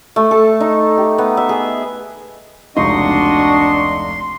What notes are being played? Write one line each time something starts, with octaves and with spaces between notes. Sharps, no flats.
A3
A4
D#4
G4
B3
E5
G#4
F1 C#2 D4 D#4 F#4 D#5 C6 C#6